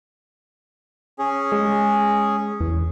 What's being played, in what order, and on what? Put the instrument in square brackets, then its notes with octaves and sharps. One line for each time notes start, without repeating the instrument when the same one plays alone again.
[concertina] C#4 G#4
[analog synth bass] G#3
E2